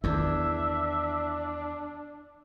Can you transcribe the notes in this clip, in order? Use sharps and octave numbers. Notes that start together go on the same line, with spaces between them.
E2 D#3 D4 E4 E5